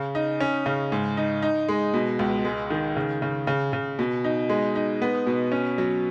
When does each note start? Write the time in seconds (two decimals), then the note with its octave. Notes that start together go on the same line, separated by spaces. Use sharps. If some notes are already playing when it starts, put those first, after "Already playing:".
Already playing: C#3
0.15 D#4
0.41 C#4
0.66 C#3
0.92 G#2
1.17 D#4
1.42 D#4
1.68 G#3
1.94 B2
2.19 C#2
2.45 G#3
2.70 D#3
2.96 C#3
3.22 C#3
3.47 C#3
3.73 C#3
3.99 B2
4.24 D#4
4.49 G#3
4.75 D#4
5.02 B3
5.27 B2
5.52 C#4
5.78 F#3